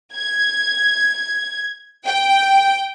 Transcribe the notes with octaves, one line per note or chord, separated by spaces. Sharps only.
G#6
G5